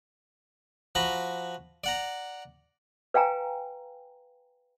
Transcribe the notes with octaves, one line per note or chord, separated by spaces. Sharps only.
F3 F#4 A#5 B5
D5 F#5 A#5
B4 F5 G5 G#5 A#5